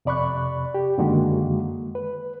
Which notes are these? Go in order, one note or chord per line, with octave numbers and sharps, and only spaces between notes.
F2 C3 D5 B5 C#6 F#6
G4
F#2 D3 D#3 G#3 A#3 F#4
B4